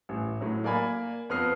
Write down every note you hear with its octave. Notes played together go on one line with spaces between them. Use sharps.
A1
A2 F#3
A#3 D5 G#5 B5
F2 B3 D#6 F6 C7